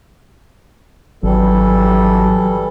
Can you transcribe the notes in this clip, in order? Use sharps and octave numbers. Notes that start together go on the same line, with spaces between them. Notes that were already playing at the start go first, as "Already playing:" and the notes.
G#1 E3 F#3 G3 A4